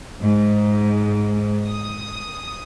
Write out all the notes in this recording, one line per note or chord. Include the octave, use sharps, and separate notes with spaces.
G#2
D#6